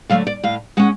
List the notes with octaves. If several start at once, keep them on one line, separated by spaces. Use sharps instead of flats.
D3 F#3 A3 F5
D5
A2 F5
G#3 C#4 F#5